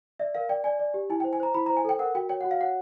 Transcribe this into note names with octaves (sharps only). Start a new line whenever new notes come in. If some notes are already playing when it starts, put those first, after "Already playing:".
D5 E5
A#4 F5
D5 G5
D5 G#5
D5
G4
E4 G#5
G5
C5
G#5
C5 A#5
E4 B5
A#5
C5
G#5
A4 G5
A#4 F#5
F#4 G5
C#5 G5
F#4 F#5
F5
C#5 F#5